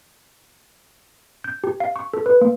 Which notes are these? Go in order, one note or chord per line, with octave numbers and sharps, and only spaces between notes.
G6
G4
F5
C#6
A4
B4
A#3